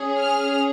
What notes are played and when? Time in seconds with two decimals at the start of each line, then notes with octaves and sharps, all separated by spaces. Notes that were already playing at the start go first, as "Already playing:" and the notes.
Already playing: C#4 G#4
0.19 F6